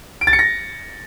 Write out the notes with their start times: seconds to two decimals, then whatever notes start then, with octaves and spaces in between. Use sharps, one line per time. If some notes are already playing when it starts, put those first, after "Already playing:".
0.21 D7
0.27 A6
0.33 C#7
0.39 A#6